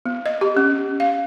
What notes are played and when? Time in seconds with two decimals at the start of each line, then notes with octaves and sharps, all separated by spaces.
0.06 B3
0.26 D#5
0.41 G4
0.57 C#4
1.00 F5